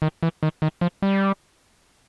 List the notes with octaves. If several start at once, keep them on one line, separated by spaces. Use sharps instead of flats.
D#3
E3
D#3
D#3
F3
G3